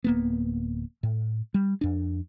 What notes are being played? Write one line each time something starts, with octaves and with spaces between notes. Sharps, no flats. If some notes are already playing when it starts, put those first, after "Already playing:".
D1 A#3 B3
A2
G3
F2 D4